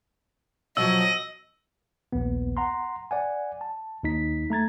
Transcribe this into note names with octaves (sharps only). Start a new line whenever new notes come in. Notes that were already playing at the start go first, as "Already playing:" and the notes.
B2 F3 F#3 D#5 E6
A#1 D#2 B3
F#5 A#5 C6
D5 F#5 G#5
A5
D#2 D#4 B6
A3 A#5 G#6 A6